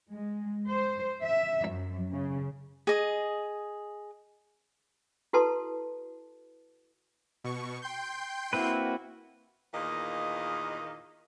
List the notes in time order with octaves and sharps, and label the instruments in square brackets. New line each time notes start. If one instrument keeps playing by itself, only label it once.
[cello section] G#3
C5
E5
F#2
C#3
[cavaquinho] G#4 D#5
[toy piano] E4 F#4 A4 B4 A5 C6
[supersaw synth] B2 C#6
G5 C6 G6
[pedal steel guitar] A#3 C4 B4 [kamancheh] E4 F#4
[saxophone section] E2 A#2 D#3 A#3 D#5